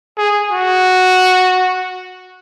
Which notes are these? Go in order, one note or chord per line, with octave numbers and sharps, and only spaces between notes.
G#4
F#4